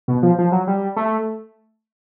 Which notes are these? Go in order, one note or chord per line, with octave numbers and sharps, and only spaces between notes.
B2
F3
F3
F#3
G3
A3